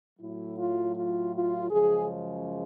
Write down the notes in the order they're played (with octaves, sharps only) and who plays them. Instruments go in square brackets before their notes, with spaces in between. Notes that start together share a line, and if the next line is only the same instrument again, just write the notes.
[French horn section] A2 F#3 E4
F4
F4
F4
F#2 C#3 F3 G#3 G#4